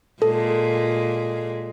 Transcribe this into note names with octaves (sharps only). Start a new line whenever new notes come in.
A#2 G#3 A4